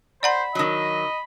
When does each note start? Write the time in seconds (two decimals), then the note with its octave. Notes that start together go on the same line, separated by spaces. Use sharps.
0.23 C5 D5 F#5 A#5 B5
0.55 D#3 F#3 D#5